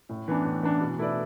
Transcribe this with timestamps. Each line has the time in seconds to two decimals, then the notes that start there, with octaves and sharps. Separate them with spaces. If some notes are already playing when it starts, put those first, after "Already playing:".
0.09 A2
0.28 E3 B3 D4
0.45 A2
0.63 E3 B3 D4
0.81 B2
0.99 A3 E4 B4 D5